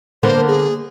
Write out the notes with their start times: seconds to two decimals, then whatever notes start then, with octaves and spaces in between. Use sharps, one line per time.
0.23 D3 A#3 B3 C5
0.48 G#4